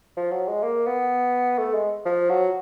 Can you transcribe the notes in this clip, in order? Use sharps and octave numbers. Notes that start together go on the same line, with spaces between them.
F3
F#3
G#3
A#3
B3
A3
G#3
F3
F#3